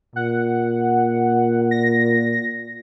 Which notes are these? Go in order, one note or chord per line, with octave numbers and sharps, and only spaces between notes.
A#2 F#5
A#6